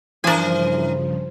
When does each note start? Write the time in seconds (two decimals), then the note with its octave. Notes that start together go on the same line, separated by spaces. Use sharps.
0.24 G2 C#3 E3 F3 D4 A#4 C5 G#5